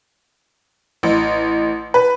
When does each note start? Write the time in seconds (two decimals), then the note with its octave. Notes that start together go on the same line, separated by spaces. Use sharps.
1.03 A1
1.94 B4